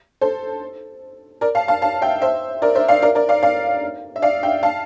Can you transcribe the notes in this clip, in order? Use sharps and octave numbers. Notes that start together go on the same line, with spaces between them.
A4 C5
A#4 D5
F5 A5
F5 A5
F5 A5
E5 G5
C5 E5
A#4 D5
C5 E5
D5 F5
A#4 D5
A#4 D5
D5 F5
D5 F5
E5
D5 F5
E5 G5
F5 A5